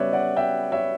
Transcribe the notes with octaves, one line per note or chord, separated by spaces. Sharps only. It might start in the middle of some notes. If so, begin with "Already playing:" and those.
Already playing: C#3 G3 B3 B4 C#5 D5 E5
D5 F#5
E5 G5
C#5 E5